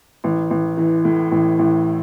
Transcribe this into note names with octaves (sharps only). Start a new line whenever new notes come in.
A1
A1
E3
A2
A1
A1